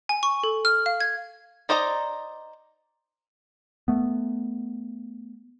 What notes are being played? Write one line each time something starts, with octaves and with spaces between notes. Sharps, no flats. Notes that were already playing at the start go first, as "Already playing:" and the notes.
G#5
C#6
A4
F6
F5
G#6
D#4 C5 D5 D#5 A#5
A3 B3